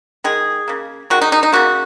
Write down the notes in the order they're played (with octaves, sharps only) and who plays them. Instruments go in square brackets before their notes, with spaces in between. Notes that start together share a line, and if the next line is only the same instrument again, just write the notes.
[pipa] D#3 G#3 G#4
C#3 A#3
D#3 G#3 F#4
D#4
D#4
D#4
C#3 A#3 F#4